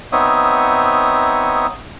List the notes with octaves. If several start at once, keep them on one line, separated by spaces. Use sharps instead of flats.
B3 C4 D#4 C#5 E5 D#6